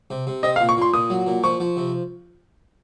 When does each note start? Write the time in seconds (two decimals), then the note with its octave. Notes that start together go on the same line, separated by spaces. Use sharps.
0.10 C3
0.27 C3
0.43 C4 D#5
0.56 F5
0.60 A#2
0.69 C#6
0.77 A#2 C6
0.94 A#2 D#6
1.10 F#3
1.27 A#2
1.43 F3 C#6
1.60 F3
1.77 C3